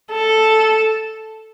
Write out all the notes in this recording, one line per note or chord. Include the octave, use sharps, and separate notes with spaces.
A4